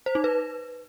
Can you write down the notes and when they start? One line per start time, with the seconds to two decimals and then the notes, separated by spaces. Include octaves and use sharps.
0.06 C5
0.15 D#4
0.24 B4